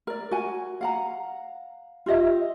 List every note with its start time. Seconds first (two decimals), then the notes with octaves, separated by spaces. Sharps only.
0.07 A#4 D5
0.31 F#4 G#5
0.81 F5 F#5 A#5
2.06 F4 G4 D#5 E5